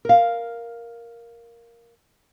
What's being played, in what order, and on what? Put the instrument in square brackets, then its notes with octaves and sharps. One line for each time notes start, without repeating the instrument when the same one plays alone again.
[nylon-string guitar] A#4 F5